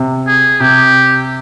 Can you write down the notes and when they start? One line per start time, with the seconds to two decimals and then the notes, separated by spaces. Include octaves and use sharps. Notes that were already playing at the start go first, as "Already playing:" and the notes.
Already playing: C3
0.27 G#4
0.60 C3 G4